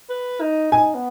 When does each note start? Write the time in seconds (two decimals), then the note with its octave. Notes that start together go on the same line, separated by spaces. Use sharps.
0.10 B4
0.41 D#4
0.72 D#4 G#5
0.95 B3